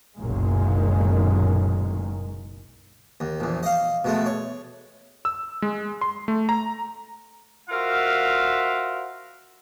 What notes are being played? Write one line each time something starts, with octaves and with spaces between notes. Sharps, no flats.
F#1 B1 F#2 A#2 D#3 G#3
D#2
A#1 E2
D#5 F5
B2 G#3 A3
C#5
E6
G#3
C6
A3
A#5
F4 F#4 A#4 C5 E5 F5